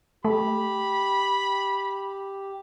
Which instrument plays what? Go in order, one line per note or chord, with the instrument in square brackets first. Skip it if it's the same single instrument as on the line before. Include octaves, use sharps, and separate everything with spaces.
[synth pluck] A3 [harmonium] G4 [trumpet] B5